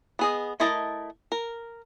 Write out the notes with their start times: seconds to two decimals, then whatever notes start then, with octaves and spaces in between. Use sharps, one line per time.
0.19 B3 G#4 D#5
0.60 A3 E4 A#4 D#5 A5
1.32 A#4